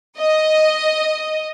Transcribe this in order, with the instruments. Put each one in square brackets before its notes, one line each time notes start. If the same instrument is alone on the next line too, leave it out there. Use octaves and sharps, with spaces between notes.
[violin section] D#5